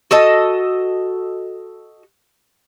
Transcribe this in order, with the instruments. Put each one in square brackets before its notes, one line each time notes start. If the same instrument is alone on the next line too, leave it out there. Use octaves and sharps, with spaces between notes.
[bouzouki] F#4 A4 D#5 A5